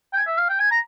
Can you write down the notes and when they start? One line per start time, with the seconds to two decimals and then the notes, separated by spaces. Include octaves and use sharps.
0.13 G5
0.16 G#5
0.27 E5
0.38 F5
0.49 G5
0.59 G#5
0.71 A#5